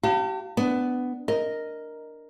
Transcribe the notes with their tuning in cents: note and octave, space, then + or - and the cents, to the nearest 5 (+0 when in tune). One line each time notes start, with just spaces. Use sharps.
G4 -40 F5 +0 A5 +40
B3 +15 D4 +0
A#4 +0 D#5 +0